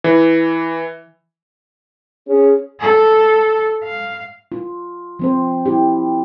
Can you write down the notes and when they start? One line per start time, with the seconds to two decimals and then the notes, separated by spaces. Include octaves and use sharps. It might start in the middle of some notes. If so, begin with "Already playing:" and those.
0.04 E3
2.28 C#4 G#4
2.80 A4
3.84 F5
4.52 F4
5.19 F3 C4 C5
5.66 E4 G4